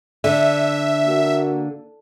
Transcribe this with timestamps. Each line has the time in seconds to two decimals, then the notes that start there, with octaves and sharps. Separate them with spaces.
0.24 D3 E5
1.07 A#3 F#4